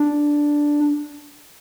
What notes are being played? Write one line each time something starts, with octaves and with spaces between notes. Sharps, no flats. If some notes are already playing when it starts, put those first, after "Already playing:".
Already playing: D4